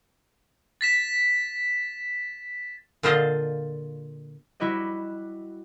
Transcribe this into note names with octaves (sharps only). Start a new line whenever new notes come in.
A6 B6 E7
A#2 D3 F4 C5 D#5 A5
G3 E4 F#4 G4 D#5